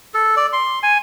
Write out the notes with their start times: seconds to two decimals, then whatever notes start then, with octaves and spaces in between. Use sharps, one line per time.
0.14 A4
0.37 D5
0.53 C6
0.83 G#5